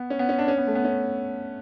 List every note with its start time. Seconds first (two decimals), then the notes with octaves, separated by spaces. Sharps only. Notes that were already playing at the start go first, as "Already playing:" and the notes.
Already playing: B3
0.10 C#4
0.19 B3
0.29 C#4
0.39 D4
0.48 C#4
0.57 B3
0.67 A3
0.75 B3
0.85 C#4